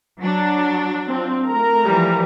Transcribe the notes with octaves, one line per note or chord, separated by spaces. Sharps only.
F#3 D4
C4 F4
A3 A#4 A#5
E3 F3 G3